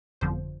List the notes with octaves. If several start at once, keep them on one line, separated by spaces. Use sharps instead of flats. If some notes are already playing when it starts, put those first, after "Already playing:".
G1 F2 D3 F3 C5